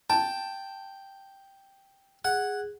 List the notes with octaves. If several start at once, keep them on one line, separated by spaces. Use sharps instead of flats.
G5 A5
G#4 F#5